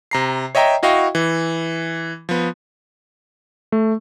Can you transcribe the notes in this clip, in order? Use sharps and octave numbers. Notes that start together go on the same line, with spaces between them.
C3 A#5 C7
C#5 D#5 E5 G5 A#5
E4 F#4 D#5 F5 G5 C#6
E3
F3 B3
A3